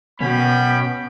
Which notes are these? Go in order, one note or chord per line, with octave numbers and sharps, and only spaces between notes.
B2 B3 C#4 F#4 G5 B5